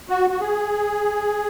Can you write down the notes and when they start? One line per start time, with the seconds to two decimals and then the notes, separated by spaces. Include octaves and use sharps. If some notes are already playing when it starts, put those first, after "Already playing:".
0.09 F#4
0.30 F#4
0.40 G#4